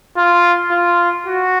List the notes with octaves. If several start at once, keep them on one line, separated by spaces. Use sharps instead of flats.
F4
F4
F#4